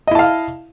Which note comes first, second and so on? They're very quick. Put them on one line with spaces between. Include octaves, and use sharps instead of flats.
D#5 E4 A5 F5